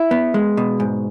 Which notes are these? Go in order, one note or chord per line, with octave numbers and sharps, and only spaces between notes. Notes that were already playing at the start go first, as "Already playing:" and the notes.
Already playing: E4
B3
G#3
B2
G#2